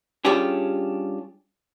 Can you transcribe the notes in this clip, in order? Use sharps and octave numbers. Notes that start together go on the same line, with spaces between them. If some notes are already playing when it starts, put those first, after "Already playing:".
G3 C#4 D4 F4 G4 G#4